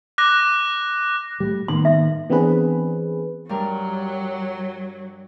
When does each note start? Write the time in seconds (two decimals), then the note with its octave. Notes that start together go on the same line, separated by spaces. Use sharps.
0.18 D6 F#6 A#6
1.40 A2 G3
1.68 A2 D#3 A#3 B3 C6
1.85 E5
2.30 E3 B3 C4 D4 G#4 B4
3.49 G2 F#3 G3 A#4